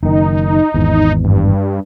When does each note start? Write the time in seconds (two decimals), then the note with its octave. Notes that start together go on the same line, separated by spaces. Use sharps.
0.03 F#1 D#3 D#4
0.74 G#1 E2
1.24 G2